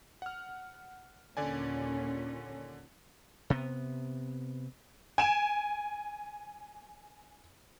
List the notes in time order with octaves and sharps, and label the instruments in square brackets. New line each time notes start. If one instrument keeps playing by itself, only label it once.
[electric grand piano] F#5 F6
[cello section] D#2 A#2 C#4 [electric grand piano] D3 D5 G#5
[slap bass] C3 B3
[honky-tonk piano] G#5 D7 E7